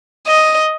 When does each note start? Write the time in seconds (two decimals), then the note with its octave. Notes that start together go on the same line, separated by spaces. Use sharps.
0.27 D#5